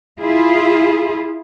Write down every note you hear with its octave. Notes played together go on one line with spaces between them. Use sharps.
E4 F4 G#4